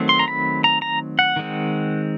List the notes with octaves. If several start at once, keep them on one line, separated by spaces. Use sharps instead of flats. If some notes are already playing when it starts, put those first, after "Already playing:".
Already playing: D#3 F#3 A3 C4
C6
A#5
B5
A#5
A#5
F#5
D#3 G#3 C4